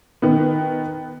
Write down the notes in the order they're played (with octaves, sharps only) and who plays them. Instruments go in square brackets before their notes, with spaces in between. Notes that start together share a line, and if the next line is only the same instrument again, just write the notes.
[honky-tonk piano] D#3 B3